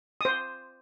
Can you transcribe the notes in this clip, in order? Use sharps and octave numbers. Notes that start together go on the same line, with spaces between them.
C5 D#6